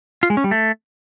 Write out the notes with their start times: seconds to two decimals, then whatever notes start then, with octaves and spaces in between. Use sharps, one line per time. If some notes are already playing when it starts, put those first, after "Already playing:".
0.23 F4
0.30 G#3
0.37 C#4
0.44 G3
0.51 A3